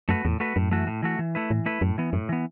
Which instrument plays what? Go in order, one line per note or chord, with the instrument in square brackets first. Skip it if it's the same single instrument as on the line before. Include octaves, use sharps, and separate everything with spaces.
[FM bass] F#2 [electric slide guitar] A3 F#4 B4
[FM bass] E2 [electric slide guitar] A2
[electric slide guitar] A3 F#4 B4
[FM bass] F#2 [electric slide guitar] A2
[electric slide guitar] E3 A3 F#4
A2
E3 A3 F#4
E3
A3 E4 B4
[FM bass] A2 [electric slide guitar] E3
[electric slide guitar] A3 E4 B4
[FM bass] F#2 [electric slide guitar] A2
[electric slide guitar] E3 B3
[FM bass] F#2 [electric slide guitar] A2
[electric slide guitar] E3 B3